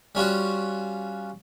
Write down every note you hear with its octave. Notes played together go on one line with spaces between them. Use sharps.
G3 C#4 F4 F#4